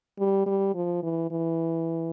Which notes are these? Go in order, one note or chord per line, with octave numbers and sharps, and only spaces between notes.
G3
G3
F3
E3
E3